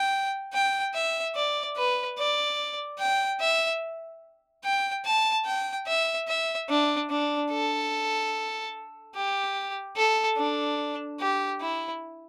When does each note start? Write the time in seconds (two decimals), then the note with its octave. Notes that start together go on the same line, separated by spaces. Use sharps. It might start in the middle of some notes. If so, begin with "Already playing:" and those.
Already playing: G5
0.53 G5
0.94 E5
1.36 D5
1.76 B4
2.18 D5
2.99 G5
3.40 E5
4.64 G5
5.05 A5
5.46 G5
5.87 E5
6.28 E5
6.69 D4
7.10 D4
7.51 A4
9.15 G4
9.97 A4
10.38 D4
11.20 G4
11.61 E4